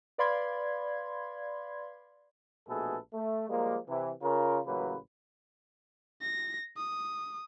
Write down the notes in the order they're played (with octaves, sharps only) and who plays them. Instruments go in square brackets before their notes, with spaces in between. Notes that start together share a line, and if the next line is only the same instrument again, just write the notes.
[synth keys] B4 D5 F5 B5 C6 G#6
[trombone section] A#1 B2 A3 G#4 A4 B4
A3
F3 G3 G#3 A#3
C3 E3
C#3 F4 A#4
A1 C#3 F#3 A#3 B4
[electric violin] A#6
D#6